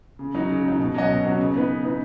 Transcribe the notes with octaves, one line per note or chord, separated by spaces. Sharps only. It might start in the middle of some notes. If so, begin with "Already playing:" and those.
C#3
F#3 D#4
C#3
F#3 D#4
B2
F#3 C#4 F#4 D#5
B2
F#3 C#4 F#4 D#5
C#3
B3 D#4 B4
C#3
B3 D#4 B4